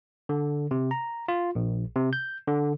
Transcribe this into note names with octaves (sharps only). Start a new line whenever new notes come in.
D3
C3
A#5
F4
A#1
C3
G6
D3